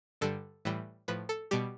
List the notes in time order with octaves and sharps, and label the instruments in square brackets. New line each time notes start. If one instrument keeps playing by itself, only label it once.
[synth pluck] G2 D3 G3 A4
A2 E3 G3
A2 F3 B4
A4
B2 G3 G4